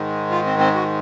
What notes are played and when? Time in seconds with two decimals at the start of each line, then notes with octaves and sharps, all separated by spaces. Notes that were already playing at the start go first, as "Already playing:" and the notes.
Already playing: G#2 D#3 G#3
0.31 F4
0.46 C4
0.59 C4
0.74 F#4